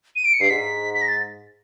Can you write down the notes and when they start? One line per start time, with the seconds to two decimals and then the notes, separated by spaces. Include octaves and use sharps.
0.16 D#7
0.25 D7
0.34 C#7
0.41 G2 C7
0.50 G#2 B6
0.94 B6
1.02 A#6
1.08 A6